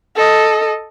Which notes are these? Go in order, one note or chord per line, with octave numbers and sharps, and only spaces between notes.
A4 D#5